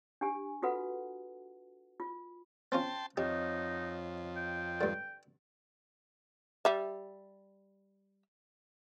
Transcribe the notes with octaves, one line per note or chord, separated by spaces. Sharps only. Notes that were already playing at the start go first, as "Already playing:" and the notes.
D4 G4 G#5
F4 F#4 A4 B4 F#5
F4
C4 C#4 F4 G5 A5 C6
F2 C4 D#4 G4 C#5 D#5
G5
G2 D3
G3 E5